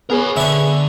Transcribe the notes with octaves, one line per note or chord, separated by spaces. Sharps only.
B3 G#4 A#4 C#5
D3 C#5 E5